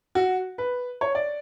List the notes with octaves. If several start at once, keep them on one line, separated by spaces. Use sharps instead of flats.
F#4
B4
C#5
D5